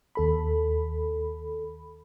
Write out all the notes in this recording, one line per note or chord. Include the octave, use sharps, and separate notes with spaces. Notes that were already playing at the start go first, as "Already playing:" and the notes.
D#2 A4 B5